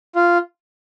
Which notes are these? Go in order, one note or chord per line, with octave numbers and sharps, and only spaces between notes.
F4